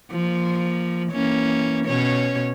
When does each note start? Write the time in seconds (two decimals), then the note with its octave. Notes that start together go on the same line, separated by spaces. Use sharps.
0.12 F3 A#3
1.12 E3 A#3 C#4
1.86 B2 C#4 C#5